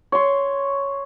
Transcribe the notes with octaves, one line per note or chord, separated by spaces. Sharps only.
C#5 C6